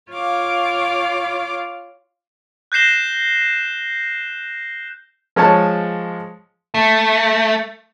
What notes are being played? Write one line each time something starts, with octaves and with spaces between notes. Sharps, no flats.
F4 C#5 F5 D6
F#6 G6 A#6 C7 E7 G7
F3 G#3 C#5 A5
A3